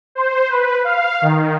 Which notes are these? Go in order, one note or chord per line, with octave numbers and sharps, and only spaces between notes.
C5
B4
F5
D#3